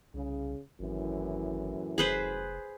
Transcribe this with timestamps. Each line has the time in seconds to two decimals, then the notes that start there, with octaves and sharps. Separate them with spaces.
0.14 C2 C#3
0.79 G#1 F#2 A2 E3
1.98 F1 G#4 B4 C5